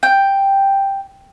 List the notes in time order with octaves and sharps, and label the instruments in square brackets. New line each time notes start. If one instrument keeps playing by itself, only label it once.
[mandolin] G5